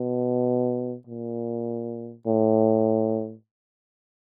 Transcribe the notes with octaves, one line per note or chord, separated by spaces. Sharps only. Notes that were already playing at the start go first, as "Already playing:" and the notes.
Already playing: B2
A#2
A2